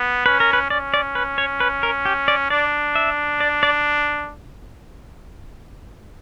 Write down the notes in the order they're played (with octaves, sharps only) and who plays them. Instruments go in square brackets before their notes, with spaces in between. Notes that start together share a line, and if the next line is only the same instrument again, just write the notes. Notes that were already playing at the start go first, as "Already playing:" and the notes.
Already playing: [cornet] B3
[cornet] C#4 [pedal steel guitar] B4
[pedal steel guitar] A#4
B4
[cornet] C#4 [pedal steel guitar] D5
[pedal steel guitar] D5
B4
C#5
B4
A#4
G4
D5
[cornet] D4 [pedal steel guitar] D5
[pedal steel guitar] E5
D5
D5